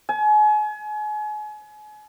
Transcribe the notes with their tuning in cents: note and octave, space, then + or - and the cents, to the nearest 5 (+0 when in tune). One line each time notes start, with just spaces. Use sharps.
G#5 +35